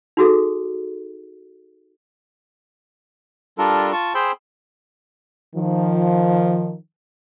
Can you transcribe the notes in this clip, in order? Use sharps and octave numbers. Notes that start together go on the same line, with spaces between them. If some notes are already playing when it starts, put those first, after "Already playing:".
D#4 F#4 G#4 A4
G3 D4 F4 A4 A#4
F4 A5 C#6
G#4 C5 G5 B5 C6 E6
D#3 F3